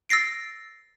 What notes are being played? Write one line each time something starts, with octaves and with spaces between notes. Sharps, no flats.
E6 A6 A#6 C7 D7